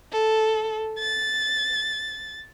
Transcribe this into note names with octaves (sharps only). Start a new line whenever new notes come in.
A4
A6